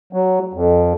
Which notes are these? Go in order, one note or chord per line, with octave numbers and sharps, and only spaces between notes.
F#3
F2